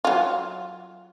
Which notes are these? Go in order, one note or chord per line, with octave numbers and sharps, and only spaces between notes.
F#3 F4